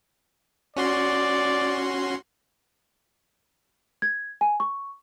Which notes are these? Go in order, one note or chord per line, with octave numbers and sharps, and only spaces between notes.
C#4 F#4 D5 C6
G#6
G#5
C#6